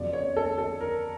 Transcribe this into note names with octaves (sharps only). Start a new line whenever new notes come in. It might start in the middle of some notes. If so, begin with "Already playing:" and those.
Already playing: F2 C#3 F#3 B3 D5
C#5
A4
A4
A#4